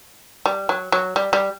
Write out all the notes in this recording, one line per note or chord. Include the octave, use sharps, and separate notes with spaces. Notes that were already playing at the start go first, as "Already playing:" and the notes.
G3
F#3
F#3
G3
G3